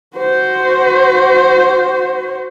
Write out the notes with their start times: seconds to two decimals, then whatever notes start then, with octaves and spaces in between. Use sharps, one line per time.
0.17 F#4 C5